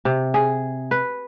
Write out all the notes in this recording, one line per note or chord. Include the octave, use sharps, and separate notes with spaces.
C3
G#4
B4